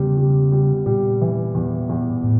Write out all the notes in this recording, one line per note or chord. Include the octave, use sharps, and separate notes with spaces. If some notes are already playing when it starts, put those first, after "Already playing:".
Already playing: E2 C#3 G3
G3
G3
A#2 G3
E3
E2
E2
A2